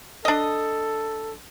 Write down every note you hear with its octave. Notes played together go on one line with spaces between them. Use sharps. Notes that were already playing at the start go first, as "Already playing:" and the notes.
D4 A4 D#5